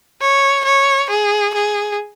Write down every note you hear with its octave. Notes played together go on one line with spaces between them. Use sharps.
C#5
C#5
G#4
G#4